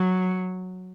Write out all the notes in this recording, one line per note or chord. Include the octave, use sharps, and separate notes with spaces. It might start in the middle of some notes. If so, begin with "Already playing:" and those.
Already playing: F#3